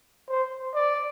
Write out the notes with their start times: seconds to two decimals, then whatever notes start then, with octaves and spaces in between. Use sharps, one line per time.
0.29 C5
0.74 D5